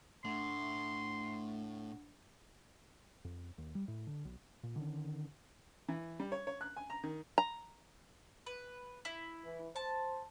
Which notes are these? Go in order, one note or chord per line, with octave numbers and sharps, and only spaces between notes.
A2 A3 D4 F#5 C6
F2
D#2
G3
A2
D3
B1
A#2
D3 D#3 C#4
E3
G3
C#5
C#5
F#6
G#5
A#5
D#3
A#5
B4
E4
E3
C5 A5